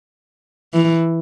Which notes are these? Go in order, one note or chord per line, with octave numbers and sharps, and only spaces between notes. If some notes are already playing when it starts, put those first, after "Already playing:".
E3